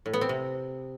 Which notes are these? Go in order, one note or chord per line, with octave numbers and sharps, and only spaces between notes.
A2
B3
C4
C3